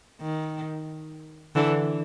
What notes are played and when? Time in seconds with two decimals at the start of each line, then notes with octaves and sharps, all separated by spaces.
0.21 D#3
1.55 D3 E3